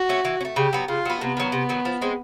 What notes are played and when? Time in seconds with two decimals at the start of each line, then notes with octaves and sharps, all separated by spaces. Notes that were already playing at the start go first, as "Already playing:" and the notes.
Already playing: F#4
0.09 A3 C#4
0.25 E3
0.41 C#4
0.45 A3
0.56 C#3 G4
0.73 F#3 B3
0.88 C#3 F4
1.05 F#3 B3
1.21 C3 B3
1.37 D#3 F#3
1.52 C3
1.69 D#3 F#3
1.85 F3
2.01 G#3 C4